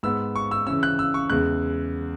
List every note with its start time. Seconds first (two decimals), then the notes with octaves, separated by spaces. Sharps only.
0.03 G#2 G#3 B3 E6
0.36 C#6
0.51 E6
0.67 C#3 E3 C#4 E6
0.83 F#6
0.99 E6
1.14 C#6
1.30 E2 C#3 G#3 F#6